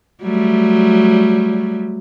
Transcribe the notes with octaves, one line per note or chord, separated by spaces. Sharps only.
F#3 G3 A3